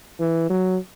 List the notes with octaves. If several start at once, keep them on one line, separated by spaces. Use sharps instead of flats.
E3
F#3